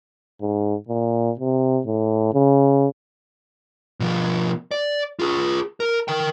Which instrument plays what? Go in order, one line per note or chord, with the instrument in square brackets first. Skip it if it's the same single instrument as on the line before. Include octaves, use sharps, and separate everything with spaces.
[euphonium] G#2
A#2
C3
A2
C#3
[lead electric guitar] B2 F3
D5
F4 G#4
A#4
A#4 G5